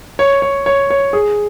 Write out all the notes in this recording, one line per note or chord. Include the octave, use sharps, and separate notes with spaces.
C#5
C#5
C#5
C#5
G#4